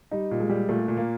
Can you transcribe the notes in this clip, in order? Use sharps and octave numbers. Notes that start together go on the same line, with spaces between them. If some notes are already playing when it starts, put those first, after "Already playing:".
G3 D#4
A#2
G#3
G3
A#2 A3
A#2
A#3